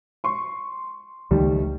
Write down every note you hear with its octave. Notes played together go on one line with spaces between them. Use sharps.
C6 C#6
C#2 D#3 F3 G3 A3